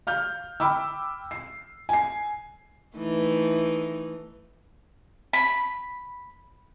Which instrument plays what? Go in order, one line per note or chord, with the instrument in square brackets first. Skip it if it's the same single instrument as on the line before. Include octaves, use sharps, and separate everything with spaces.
[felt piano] F5 F6 G6
G5 B5 D6 E6
C7
G#5 C7
[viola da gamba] E3 A3 D#4
[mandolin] B5